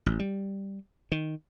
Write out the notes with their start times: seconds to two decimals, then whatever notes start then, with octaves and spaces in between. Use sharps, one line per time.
0.06 A1
0.19 G3
1.12 D#3